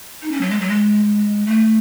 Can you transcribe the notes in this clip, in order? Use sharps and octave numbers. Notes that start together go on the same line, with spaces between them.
D#4
C#4
F#3
G#3
F#3
G#3
A3